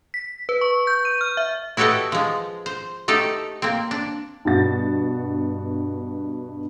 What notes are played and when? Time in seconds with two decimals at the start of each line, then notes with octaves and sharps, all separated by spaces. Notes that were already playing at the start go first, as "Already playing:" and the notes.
0.14 B6
0.49 B4
0.61 C#6
0.87 G6
1.05 D#7
1.21 F6
1.37 E5
1.77 E4 F#4 G4 A4 B4 D#5
2.12 F3 G#3
2.66 C5
3.08 A3 D#4 G4 A4
3.62 A#3 C4
3.91 D4
4.45 G2 B2 F#4 A6